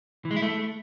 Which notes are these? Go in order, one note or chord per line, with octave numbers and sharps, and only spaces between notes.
E3
G#3
E4
A3